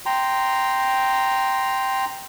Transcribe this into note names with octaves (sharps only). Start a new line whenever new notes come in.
G5 A#5 C6